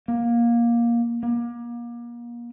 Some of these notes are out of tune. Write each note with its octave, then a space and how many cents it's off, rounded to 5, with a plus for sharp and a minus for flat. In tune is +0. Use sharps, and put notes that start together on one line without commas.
A#3 +15
A#3 +35